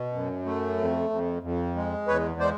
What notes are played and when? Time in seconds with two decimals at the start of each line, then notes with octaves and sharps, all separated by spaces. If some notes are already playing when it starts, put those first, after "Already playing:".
Already playing: B2
0.13 F#2
0.46 A3
0.78 F2
1.10 F2
1.42 F2
1.75 G#3
2.07 E2 B4 C#5
2.40 G#3 C5 D5